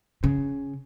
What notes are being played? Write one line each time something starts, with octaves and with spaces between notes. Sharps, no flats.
C#3